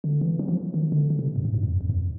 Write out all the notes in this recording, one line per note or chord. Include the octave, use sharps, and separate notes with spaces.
D3
E3
F#3
F3
D#3
D3
D3
C3
G2
G#2
G2
F2
E2
F2